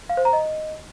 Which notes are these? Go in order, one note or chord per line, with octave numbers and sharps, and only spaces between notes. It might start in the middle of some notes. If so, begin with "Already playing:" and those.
F5
C5
A#5
D#5